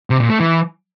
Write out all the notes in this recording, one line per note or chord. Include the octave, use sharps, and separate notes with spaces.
C3
A#2
A3
E3